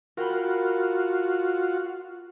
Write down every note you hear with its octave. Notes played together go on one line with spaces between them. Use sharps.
F4 F#4 A#4 G5 B5